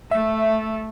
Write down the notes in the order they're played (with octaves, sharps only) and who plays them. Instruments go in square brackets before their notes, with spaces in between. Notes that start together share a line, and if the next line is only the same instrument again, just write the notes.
[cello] A3 [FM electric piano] E5